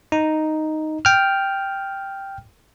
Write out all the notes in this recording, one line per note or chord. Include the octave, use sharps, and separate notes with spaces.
D#4
G5 F6